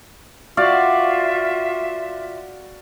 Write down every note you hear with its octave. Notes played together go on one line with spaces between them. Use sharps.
F4 F#4 D5 E5 F5